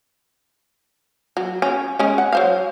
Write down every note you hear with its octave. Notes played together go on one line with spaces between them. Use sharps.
F#3
C#4
G#3 C#4
F#5
F#3 C5 F5